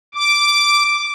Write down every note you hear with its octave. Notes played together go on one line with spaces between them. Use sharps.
D6